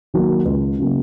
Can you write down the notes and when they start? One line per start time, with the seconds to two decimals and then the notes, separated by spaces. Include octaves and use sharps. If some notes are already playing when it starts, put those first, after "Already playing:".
0.14 D#3 F#3 A#3
0.46 C#2
0.79 C#3 F#3 A#3